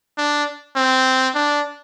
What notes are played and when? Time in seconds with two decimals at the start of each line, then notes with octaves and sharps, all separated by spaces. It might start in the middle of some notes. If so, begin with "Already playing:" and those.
0.18 D4
0.76 C4
1.35 D4